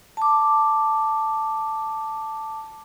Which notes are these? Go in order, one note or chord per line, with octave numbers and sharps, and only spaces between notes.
A5 D6